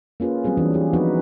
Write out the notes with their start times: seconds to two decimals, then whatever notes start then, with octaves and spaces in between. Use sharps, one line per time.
0.20 A#3 C#4 F4 G#4 B4
0.44 F#3 G3 C4 G#4
0.57 E3 C#4 D4
0.74 G4 G#4
0.93 F3 B3 D#4 F#4 B4